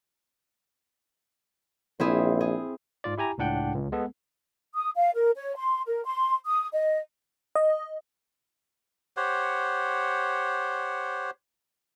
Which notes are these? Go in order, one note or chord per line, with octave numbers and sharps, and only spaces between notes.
A#1 C4 E4 G#4
G#4
G#2 F4 D5
E4 G4 G#5 A#5
C#2 A2 D4 F#5 G5
C#2
G#3 B3 A4
D#6
F5
A#4
C#5
C6
A#4
C6
D#6
D#5
D#5
G4 C5 C#5 F#5